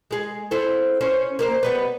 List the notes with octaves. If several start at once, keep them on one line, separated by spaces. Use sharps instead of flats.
G#3 G#4
C4 E4 A4
C#4 C5
A#3 A#4 C5
G3 B3 B4